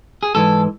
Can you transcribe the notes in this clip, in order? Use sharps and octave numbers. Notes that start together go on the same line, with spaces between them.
G#4
G#2 E3 A4